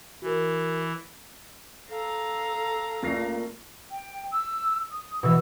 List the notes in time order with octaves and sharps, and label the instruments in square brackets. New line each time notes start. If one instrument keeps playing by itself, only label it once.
[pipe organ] E3 [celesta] F#4 A#4
[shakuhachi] A4 [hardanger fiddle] F5 A#5
[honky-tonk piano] C#2 A#6 C7 [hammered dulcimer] A#2 A3 A#4
[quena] G5
E6
D#6
[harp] B2 E3 [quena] E6